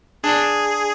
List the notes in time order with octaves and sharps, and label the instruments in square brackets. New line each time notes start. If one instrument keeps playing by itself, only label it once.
[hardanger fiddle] D4 [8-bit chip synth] G#4